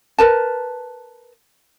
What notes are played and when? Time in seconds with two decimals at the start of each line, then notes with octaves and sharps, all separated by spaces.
0.19 A#4 B4 A5